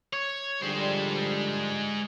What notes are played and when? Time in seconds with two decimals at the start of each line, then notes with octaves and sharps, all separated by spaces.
0.13 C#5
0.62 D3 F3 G3 G#3 C5